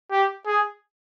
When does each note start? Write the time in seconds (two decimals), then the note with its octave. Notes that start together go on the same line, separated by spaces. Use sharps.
0.12 G4
0.46 G#4